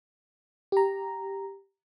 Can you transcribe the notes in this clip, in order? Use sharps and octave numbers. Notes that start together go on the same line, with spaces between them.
G4 A#5